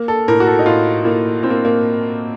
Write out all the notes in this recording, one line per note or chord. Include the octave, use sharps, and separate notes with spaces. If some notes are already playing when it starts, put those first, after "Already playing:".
Already playing: A#3
A4
A2 A#4
F#4
A4
D#4
A2 F4
A2 A#3
A2 C4
A#3
A#3